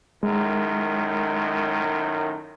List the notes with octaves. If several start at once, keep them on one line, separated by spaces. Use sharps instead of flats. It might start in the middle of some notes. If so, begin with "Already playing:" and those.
F#2 A2 D#3 G#3